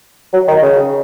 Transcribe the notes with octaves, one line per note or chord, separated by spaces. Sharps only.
F#3
D#3
C#3